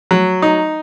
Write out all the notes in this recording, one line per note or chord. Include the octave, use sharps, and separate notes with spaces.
F#3
D#4